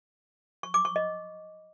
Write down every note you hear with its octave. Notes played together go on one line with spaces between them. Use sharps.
C#6
D6
C#6
D#5